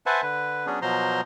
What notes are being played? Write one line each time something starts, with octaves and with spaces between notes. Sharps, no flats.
B4 C5 E5 F#5 G#5 A5
D3 B4
F#3 B3 C#4 D4 G#4
B2 F3 F#3 C5 A#5 C6